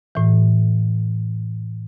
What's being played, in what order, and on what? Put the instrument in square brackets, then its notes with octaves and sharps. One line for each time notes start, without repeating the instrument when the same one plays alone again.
[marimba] A2 E3